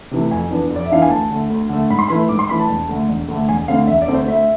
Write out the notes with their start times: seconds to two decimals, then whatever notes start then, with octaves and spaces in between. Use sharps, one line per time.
0.11 C3 E3 A3
0.31 F2 G#5
0.51 E3 B3 D4
0.71 F2
0.76 D5
0.85 E5
0.91 E3 B3 D4 F5
1.02 G#5
1.10 D2 A5
1.31 D3 A3
1.50 D2
1.69 D3 A3
1.90 G#2 B5
1.99 C6
2.08 E3 A3 B5
2.29 G#2 D6
2.39 C6
2.49 E3 A3 B5
2.59 A5
2.69 E1
2.89 D2 D3 A3
3.09 E1
3.28 D2 D3 A3
3.49 E1 G#5
3.68 D2 D3 A3 C4 F5
3.87 E1 E5
4.02 D5
4.08 D2 D3 A3 C4
4.14 C5
4.28 D2 E5